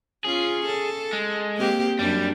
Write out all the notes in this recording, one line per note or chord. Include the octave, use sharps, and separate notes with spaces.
C#4 F4 G#4
A4
G#3
A#3 C4 G4
F#2 G3 D4